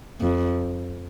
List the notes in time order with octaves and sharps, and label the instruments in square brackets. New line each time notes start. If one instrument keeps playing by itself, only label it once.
[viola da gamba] F2